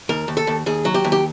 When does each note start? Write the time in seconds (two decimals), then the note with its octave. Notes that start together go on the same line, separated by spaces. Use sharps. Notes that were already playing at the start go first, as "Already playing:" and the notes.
0.09 D#2 A#4
0.28 D#2
0.37 A4
0.47 D#2
0.66 D#2 G#4
0.85 F#3
0.94 G4
1.05 D#2
1.12 G4